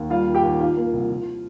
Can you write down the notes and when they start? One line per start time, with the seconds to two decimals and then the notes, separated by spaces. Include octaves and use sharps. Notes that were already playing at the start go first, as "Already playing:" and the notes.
Already playing: D#2
0.10 G3 F4 F5
0.27 D#2
0.35 G4 G5
0.43 D#2
0.60 D#3 F4 F5
0.77 A#3
0.93 C2
1.10 F3